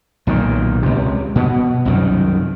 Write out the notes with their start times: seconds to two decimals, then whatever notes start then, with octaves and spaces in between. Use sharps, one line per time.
0.27 B1 A#2 D#3
0.83 C#2 C3
1.36 B2 B3
1.85 C2 F#2 D#3